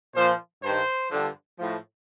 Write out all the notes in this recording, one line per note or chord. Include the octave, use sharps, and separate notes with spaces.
A#2 F3 C5
G2 D#3 C5
G2 D3 F3
A2 F3